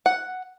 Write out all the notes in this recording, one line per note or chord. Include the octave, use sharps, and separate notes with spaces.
F#5